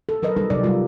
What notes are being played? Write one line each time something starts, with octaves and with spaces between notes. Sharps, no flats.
A4
F#3 A#4 B4 D#5
G3 D#4 A4 A#4
C3 F#3 D#4 D5
G3 F4